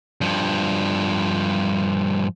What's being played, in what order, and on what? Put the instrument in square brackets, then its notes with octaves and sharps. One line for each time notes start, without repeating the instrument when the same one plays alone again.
[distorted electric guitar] G2 F3